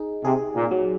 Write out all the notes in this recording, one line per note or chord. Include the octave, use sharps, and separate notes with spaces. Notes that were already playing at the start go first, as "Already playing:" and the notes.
Already playing: D#4 G#4
C3 G#4
A#2
F#3